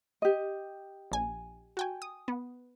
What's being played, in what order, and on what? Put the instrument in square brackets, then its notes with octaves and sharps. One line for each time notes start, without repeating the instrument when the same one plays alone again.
[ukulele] G4 D#5
[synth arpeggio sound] A#1 G#5
F#4 G5 G#5
D#6
B3